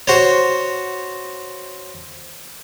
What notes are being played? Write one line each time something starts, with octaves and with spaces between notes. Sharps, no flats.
F#4 C5 C#5